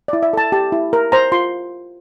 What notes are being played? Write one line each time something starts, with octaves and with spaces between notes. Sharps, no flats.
E4 D5
E5
A4 A5
G4 A5
E4
A#4
C5 A#5
F4 C6